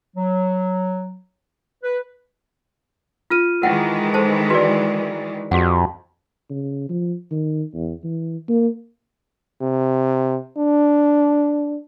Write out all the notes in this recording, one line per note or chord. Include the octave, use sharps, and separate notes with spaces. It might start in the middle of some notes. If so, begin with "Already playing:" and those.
F#3
B4
F4 F6 D#7
D#3 E3 G#3 A#4 F#5 G5
A4 C5 A5
F#4 A#4 B4 D5
F2 F#4 G#4 F#5
C#3
F3
D#3
E2
E3
A#3
C3
D4